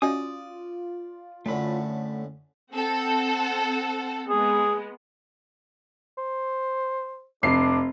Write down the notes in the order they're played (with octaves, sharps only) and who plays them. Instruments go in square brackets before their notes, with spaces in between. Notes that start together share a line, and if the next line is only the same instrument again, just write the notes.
[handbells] C#4 F#4 D#5 [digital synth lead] F4 [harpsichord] D5 [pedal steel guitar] D#6
[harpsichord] F#2 A2 D3 [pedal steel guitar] A3 B5
[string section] C4 A4 F#5
[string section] G#3 B3 [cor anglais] G#4
[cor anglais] C5
[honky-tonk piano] F1 C7 [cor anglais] D4